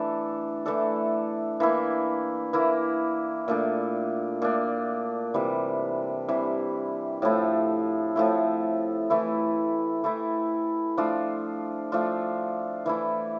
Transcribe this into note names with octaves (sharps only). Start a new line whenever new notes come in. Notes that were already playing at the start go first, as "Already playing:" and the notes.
Already playing: E3 A3 D4 A4
E3 A3 D4 A4
E3 A#3 E4
E3 A#3 E4
A#2 A3 D4
A#2 A3 D4
C3 E3 G3
C3 E3 G3
A2 F3 A3 E4
A2 F3 A3 E4
E3 A3 E4
E3 A3 E4
F3 A3 D4 F4
F3 A3 D4 F4
E3 A3 E4